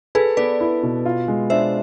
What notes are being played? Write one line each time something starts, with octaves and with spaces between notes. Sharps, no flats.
G#4 A4 B4
B3 B4 D5
E4
B2
F4
G#3
D4 C5 E5